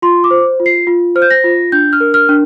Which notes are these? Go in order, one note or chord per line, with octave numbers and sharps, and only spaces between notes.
F4 C6
D6
C5
F4
C7
F4
C5 F6
G6
A#6
F4
D4 G6
F6
A#4
F6
D4